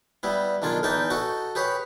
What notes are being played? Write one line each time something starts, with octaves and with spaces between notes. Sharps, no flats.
G3 B3 E4
B1 D#3 D4 F4 G#5
E2 E3 D#4 D#5 G5 A5
F#4 A4 D#5
G4 G#4 B4 C#5